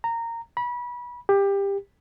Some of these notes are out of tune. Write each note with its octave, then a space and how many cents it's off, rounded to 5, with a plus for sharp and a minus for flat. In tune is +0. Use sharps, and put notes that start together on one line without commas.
A#5 -15
B5 -25
G4 +20